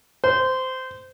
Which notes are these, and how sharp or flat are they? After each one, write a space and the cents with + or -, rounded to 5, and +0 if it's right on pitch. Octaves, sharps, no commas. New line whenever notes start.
C5 -15